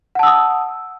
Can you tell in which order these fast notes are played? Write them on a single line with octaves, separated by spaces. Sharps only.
F#5 A5 E6 D#6